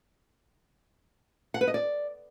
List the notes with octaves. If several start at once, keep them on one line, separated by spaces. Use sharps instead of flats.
F#5
B4
D#5
D5